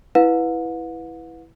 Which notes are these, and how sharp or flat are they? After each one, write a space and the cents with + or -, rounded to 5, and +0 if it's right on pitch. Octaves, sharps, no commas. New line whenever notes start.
E4 +0 B4 +0 F#5 -45